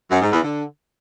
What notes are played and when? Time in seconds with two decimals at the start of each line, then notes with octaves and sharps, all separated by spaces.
0.11 F#2
0.22 G#2
0.32 E2
0.43 D3